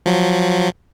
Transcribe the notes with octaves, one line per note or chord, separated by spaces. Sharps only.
F3 F#3